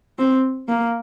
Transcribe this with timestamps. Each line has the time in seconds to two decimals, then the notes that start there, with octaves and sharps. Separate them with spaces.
0.19 C4
0.69 A#3